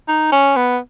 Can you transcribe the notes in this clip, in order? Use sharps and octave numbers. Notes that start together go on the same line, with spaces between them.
D#4
C#4
B3